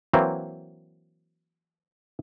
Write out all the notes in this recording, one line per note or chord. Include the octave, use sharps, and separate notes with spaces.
E3 F#3 A#3 C4